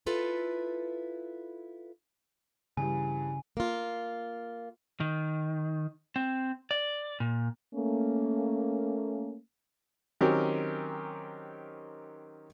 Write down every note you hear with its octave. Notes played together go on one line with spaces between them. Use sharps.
E4 F4 A4 B4
G2 C#3 E3 G3 G#5
A#3 F4
D#3
C4
D5
A#2
A3 A#3 C#4
D#3 F#3 C4 C#4 G4 A#4